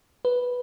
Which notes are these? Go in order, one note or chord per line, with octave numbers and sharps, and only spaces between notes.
B4